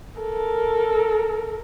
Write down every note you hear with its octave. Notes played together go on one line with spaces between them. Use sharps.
A4 A#4